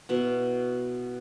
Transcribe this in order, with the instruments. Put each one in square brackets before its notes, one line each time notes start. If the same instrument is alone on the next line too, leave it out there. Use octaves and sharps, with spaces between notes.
[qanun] B2 B3 E4